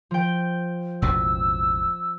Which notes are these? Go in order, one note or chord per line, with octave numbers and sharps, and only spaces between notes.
F3 G5
E1 A1 B2 E6